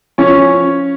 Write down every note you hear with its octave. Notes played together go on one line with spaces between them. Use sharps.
F3 C#4 C#5